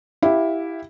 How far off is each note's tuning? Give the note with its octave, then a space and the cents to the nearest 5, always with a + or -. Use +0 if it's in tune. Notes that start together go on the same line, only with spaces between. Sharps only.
E4 +0 G4 +0 F5 +15